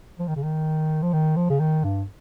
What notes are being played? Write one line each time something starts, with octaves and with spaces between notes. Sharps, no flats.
F3
D#3
C#3
D#3
F3
D#3
F3
C#3
D#3
G2